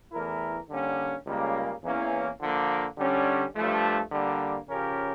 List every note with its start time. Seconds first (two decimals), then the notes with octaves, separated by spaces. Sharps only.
0.12 E2 E3 A3 E4 A#4
0.69 D3 G3 A#3 C#4
1.26 C#2 C#3 G3 A#3
1.84 E2 E3 A#3 C#4
2.40 D3 F3 A#3
2.98 D3 G3 C#4
3.55 G2 F3 A3
4.11 D3 G3 A#3
4.69 C#3 F3 C#4 G4 A#4